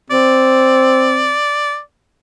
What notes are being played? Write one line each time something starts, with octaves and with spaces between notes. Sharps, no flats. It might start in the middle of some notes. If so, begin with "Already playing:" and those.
C4 D5